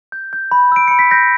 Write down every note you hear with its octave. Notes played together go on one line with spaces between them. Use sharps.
G6
G6
B5
E6 D7
B5 C#7
B6
G6 A#6